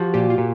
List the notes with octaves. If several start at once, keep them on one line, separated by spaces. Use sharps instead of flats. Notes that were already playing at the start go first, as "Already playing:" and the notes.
Already playing: F3 F#4 G4
A#2 G4
F4
A#2